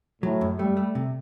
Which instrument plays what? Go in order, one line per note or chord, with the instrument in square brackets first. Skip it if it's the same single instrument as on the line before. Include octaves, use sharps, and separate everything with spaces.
[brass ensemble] A2 [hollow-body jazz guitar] F#3
[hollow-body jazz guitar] F#2
[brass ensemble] G3 [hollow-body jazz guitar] A3
[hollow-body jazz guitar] A3
C3